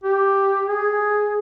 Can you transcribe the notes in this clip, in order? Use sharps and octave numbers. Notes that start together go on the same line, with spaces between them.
G4
G#4